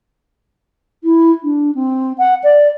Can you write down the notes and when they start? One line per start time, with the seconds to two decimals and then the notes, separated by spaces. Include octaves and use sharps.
1.04 E4
1.43 D4
1.75 C4
2.18 F#5
2.43 D5